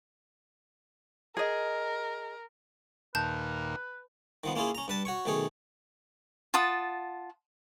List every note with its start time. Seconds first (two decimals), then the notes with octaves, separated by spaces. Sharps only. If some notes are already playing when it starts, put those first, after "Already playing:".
1.37 G#4 A#4 D#5
3.15 D#2 A#2 B4 A5 G6
4.44 D#3 F3 B3
4.56 A#3 C#4 E4 F4 G#4
4.75 C#4 A#5
4.88 G2 B4 A5
5.05 F#4 C#5 C#6
5.26 B1 D#3 A3 G#4 C#5
6.54 F4 F#5 A5 D#6